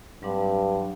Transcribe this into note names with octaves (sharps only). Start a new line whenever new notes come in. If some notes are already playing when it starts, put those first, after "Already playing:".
G2 F#3 C4 D4